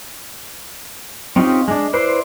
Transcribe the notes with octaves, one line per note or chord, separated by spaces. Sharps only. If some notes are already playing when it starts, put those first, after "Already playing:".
C4 C#4 D#4 F4 G4
G#3 D4
E4 B4 C5 D5 C6